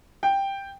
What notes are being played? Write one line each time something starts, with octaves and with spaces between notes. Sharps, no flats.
G5